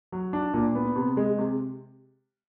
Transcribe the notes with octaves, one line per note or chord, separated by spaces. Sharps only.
F#3
D4
A#2
B3
C3
G#3
C3